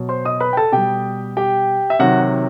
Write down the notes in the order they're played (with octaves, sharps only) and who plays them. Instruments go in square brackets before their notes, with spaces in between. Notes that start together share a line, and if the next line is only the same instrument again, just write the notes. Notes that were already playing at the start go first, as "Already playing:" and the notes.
Already playing: [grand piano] B2 F#3
C5 C6
D#5 D#6
B4 B5
G5
A4 A5
B2 G3 G4 G5
G4 G5
E5
C3 D#3 F#3 F#4 F#5